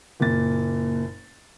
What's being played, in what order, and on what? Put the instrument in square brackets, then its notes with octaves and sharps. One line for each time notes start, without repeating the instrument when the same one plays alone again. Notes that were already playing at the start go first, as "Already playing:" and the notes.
[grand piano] F#1 A#2 A6